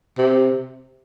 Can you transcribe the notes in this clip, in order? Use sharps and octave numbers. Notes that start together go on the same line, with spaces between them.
C3